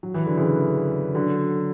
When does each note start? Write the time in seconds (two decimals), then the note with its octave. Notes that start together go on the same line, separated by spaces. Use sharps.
0.03 F#3
0.14 E3
0.26 D3
0.37 C#3 E3
1.15 D3 F#3